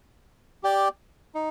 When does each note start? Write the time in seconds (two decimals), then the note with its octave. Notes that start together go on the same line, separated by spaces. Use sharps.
0.63 G4 D5 G5
1.35 D#4